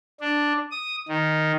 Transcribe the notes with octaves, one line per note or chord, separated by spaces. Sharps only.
D4
D#6
D#3